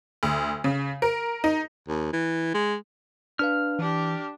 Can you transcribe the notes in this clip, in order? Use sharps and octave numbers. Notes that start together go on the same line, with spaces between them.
D2
C#3
A#4
D#4
D#2
E3
G#3
D4 B4 F5 F6
E3 D4 G4